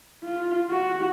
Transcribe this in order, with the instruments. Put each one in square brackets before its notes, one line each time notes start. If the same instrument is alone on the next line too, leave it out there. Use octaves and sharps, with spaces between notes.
[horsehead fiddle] F4
F#4